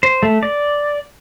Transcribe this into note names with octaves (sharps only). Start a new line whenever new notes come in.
C5
A3
D5